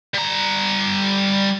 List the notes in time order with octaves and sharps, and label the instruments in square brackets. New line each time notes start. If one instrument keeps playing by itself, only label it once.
[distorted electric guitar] G3 A#5